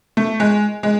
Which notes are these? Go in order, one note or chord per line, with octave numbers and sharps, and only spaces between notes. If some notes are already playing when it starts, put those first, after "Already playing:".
A3
G#3
G#3